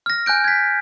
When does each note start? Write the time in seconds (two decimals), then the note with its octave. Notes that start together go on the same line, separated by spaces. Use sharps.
0.06 F6 A#6
0.26 G#5 F#6 G6 D7
0.44 G#6 B6